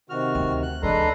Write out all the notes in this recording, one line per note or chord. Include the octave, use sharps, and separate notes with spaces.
C3 D#3 F#4 F6
D2
F#6
C#2 E3 G#3 D4 A4 B4 A#5 C6